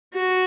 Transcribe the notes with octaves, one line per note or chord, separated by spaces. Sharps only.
F#4